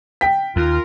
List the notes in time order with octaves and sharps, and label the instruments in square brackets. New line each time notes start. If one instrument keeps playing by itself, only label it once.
[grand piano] G5 B6
[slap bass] D#2 [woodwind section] F4 A#4